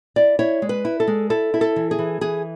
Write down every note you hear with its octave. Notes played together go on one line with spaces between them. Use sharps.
E4 D5
E4 C#5
G#3
B4
E4
A4
G#3
E4 A4
E4
A4
E3
G#4
E3
E3 G#4